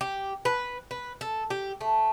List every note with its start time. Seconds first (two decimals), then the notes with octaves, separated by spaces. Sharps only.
0.01 G4
0.45 B4
0.91 B4
1.21 A4
1.50 G4
1.81 A3